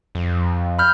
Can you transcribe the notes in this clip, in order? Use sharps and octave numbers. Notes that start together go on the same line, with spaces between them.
F2
B5 F6 G6